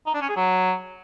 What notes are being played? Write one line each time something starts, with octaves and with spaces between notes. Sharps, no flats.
D#4
D4
C#4
G#4
F#3